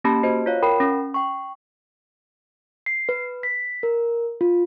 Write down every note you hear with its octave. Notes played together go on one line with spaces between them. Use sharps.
A#3 C#4 G4 A5 B5
F#4 C5 D#5
F4 C#5 F5
A#4 G5 B5
C#4
G5 C#6
C7
B4
B6
A#4
F4